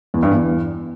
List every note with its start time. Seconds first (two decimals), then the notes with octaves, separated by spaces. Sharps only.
0.14 E2
0.23 G2
0.31 E2